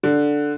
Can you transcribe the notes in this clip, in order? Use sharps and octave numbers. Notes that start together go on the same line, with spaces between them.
D3